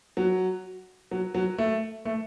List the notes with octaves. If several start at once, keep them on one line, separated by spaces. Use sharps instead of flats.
F#3
F#3
F#3
A3
A3